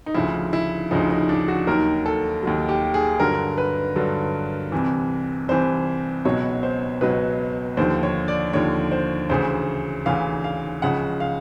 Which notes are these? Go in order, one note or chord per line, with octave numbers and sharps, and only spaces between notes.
D#4
D2 C#3 F3 E4
E4
D2 C#3 F3 D#4
D#4
D4
F#4
D#2 D#3 F#3 A#4
A4
D#2 D#3 F#3
G4
G#4
G2 D3 F#3 A#4
B4
G2 D3 F#3
C2 C3 E3
C2 C3 E3 C5
C#2 B2 F#3 C#5
C5
C#2 B2 F#3 B4
D#2 D3 F3 C5
C#5
D5
D#2 D3 F3 C#5
C5
D2 C#3 E3 C5
D2 C#3 E3 F5
F5
C#2 C#3 F3 F#5
F5